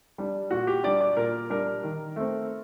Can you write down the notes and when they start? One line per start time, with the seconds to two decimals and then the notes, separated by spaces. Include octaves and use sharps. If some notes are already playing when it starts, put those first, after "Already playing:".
0.18 G3 D4
0.51 A#2 F#4
0.67 G4
0.84 G3 D4 D5
1.01 D5
1.17 A#2 A#4
1.50 G3 D4 A#4
1.83 D#3
2.16 A3 C4